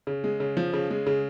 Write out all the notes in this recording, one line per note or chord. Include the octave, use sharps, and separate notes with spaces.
C#3
G#3
C#3
F3
C#3
G#3
C#3